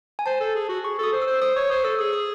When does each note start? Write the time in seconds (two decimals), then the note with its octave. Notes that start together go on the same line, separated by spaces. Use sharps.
0.19 G#5
0.26 C5 A5
0.40 A4
0.55 G#4
0.69 F#4
0.85 G#4 C#6
0.99 A4 D#6
1.13 C5
1.22 E6
1.27 C5
1.41 C5 D#6
1.56 C#5 C#6
1.70 C5 D#6
1.84 A4 E6
1.99 G#4 D#6
2.13 D#6